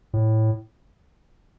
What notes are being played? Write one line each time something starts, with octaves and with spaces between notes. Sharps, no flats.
A2